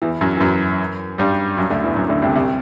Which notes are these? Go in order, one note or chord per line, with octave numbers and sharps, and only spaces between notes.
E2 E3
F#2 F#3
E3
F#2 F#3
G2 G3
F#2 F#3
D2 D3
E2 E3
F#2 F#3
D2 D3
C2 C3
C2 C3